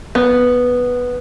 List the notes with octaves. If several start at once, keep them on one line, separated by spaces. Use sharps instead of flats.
B3